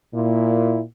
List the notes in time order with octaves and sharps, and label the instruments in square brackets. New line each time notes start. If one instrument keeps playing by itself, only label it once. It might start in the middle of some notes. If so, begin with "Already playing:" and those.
[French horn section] A#2 [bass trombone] E4